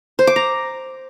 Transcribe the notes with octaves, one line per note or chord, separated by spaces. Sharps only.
C5
D6
A#5